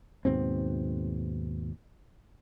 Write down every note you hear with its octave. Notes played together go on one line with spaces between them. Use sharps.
D#2 G#2 B2 C4